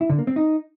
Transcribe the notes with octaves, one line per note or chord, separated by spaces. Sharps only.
E4
D3
A#3
C4
D#4